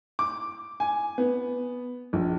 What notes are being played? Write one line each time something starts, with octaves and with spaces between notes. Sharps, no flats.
D6
G#5
B3
A#1